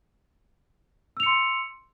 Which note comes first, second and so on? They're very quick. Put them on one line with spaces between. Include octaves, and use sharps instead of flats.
E6 F7 C#7 C6